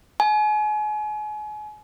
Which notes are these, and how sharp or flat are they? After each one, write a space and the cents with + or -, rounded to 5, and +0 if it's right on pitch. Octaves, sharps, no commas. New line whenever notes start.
G#5 +35